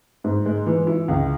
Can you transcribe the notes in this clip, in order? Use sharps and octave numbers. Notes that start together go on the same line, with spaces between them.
G#2
G#3
E3
E4
C#2